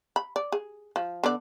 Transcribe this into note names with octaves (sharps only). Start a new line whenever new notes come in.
B5
D5
G#4
F3
D3 B3 D5